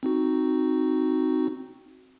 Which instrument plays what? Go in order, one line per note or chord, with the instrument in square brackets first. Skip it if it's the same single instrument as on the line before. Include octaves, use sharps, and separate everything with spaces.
[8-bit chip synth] C4 D#4 F#4